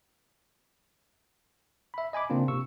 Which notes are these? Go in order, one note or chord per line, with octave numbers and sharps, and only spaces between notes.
E5 B5
D#5 G#5 B5 D6
C#3 A#3 C4 D4 F4
C3 C#6 E6